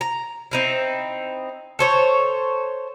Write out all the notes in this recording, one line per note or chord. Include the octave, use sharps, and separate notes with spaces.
A#5
C4 D#4 E4
A4 C5 C#5